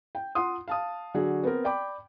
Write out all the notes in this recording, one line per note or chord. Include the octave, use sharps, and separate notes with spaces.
G5
F4 F#5 C6 D#6
F5 A5 D#6
D3 F#3 F#4 G#4
B3 C4 A#4
D5 G5 B5 D6